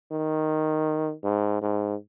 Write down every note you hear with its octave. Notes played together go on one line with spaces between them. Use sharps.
D#3
G#2
G#2